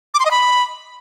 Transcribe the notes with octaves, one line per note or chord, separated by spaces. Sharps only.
D6
C6
D#5
B5